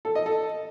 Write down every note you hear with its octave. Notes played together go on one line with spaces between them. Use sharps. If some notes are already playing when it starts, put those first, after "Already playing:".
A4
D#5
A4